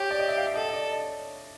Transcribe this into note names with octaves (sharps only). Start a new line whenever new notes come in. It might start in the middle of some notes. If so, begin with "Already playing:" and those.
Already playing: G4 C#5
D5
D#5
E5
F5
E5
A4 D#5
D#5
D5
D#5
C#5